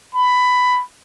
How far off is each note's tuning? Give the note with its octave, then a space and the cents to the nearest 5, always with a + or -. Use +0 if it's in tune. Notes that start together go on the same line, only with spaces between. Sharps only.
B5 +10